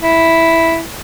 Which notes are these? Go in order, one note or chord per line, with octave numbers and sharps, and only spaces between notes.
E4